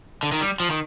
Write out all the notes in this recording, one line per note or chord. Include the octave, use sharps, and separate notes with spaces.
D3
D#3
G3
F3
D#3